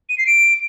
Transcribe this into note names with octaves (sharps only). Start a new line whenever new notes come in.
D#7
C7
D7